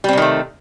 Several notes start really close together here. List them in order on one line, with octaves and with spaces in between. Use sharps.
G3 C4 C3 D#3 A3